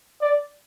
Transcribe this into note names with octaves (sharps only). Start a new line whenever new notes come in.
D5